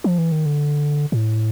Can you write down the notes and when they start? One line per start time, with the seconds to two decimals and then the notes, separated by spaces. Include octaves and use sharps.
0.04 F3
0.18 E3
0.32 D#3
0.46 D3
1.12 A2